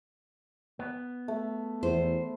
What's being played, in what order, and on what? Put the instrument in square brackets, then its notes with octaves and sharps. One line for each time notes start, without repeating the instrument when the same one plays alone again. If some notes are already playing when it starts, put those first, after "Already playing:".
[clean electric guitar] B3
[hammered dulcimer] A3
[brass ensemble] E2 [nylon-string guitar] C5